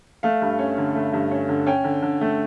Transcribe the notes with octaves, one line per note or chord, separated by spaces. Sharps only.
A3 F5
G2
C#4
D3
A3
G2
C#4
D3
C#4 G5
D3
D3
A3